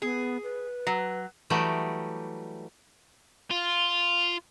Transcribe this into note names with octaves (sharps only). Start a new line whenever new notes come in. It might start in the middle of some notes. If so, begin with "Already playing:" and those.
B3 G#4
B4
F#3
E3 F#3 G3 A3 G4 D#5
F4